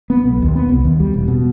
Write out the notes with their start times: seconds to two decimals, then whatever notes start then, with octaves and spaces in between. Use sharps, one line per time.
0.10 B3
0.24 B1
0.42 D#2
0.55 B3
0.69 C2
0.84 D#2
1.00 G3
1.14 E1
1.28 B2